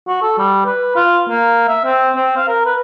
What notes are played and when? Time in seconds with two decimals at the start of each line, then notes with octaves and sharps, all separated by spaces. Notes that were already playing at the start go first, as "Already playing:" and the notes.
0.08 F#4
0.22 A4
0.38 G3
0.65 B4
0.95 F4
1.29 A#3
1.68 E5
1.85 C4
2.16 C4
2.37 F5
2.48 A#4
2.65 B4